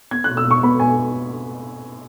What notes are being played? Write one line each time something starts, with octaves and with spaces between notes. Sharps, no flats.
B3 G#6
B2 F#6
E6
B2
C#6
B3 B5
B2 G#5